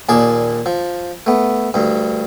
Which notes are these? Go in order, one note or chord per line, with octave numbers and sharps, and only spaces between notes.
D#2 A#2 G#4 D5 A5
F3
A3 B3
D2 G2